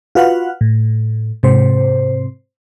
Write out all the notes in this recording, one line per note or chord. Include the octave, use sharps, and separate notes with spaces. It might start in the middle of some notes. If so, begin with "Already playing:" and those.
F4 F#4 B4 F5 F#5
A2
G#2 C3 C5